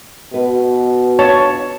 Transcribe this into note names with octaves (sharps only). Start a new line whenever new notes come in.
B2 B4
D4 F4 C#5 A5